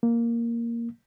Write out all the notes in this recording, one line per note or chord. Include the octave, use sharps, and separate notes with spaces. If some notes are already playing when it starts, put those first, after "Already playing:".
A#3